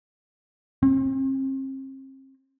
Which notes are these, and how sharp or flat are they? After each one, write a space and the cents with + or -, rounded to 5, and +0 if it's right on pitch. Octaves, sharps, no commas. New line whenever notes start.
C4 +40